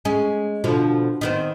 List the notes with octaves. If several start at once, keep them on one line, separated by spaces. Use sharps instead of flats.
G#3 C#4
B2 D3 F3
D#3 B3 C4